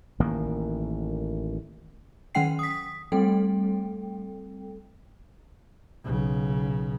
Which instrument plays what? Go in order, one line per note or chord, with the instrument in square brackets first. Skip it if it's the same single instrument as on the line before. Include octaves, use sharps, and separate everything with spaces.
[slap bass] A1 D#3 A#3
[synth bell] D#3 F#3 C#4 F#5 G5 C7
D#6 B6
G3 A3 C4 A4 G5
[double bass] B1 C#3